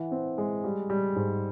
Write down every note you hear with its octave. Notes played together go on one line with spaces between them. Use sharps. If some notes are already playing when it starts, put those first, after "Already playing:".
Already playing: E3 F#5
C4
G#3
G3
G3
G#2